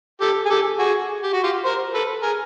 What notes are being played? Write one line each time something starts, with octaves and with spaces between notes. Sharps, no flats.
G4 A4
G#4
G4 A4
F#4 G#4
G4
F#4
F4 G4
A#4 C5
A4 B4
G#4 A#4